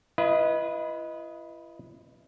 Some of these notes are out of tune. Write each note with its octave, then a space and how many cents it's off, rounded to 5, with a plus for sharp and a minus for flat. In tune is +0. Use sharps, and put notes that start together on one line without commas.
E4 +45 B4 -15 D#5 +10